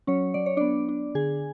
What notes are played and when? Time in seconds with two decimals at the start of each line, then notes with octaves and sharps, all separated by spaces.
0.07 F#3 C#4 C#5
0.34 F#3 D5
0.46 C#5
0.57 B3 D4 D5
0.89 D4
1.15 D3 G#4 G#5